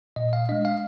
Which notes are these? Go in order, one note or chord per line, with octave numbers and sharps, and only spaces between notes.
A#2 D#5
F5
G#3 D4 D#5
F5